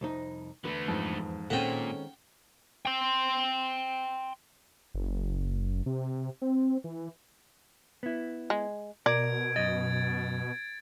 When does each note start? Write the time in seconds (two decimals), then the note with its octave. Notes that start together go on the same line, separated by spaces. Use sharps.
0.01 C2 F2 D#4
0.64 E2 D3 A3 B4
0.88 F2 G#2
1.50 A#2 D#3 G#3 C4 C#4 A4 F#5 G5
2.85 G5 C6
4.94 F#1
5.86 C3
6.42 C4
6.84 E3
8.03 B3 E4
8.50 G#3
9.06 B2 A#4 D5 G#6 D7
9.56 F#2 D#5 A6